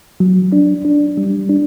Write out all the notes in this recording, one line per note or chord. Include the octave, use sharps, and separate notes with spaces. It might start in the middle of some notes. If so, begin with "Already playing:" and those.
F#3
D4
D4
G3
D4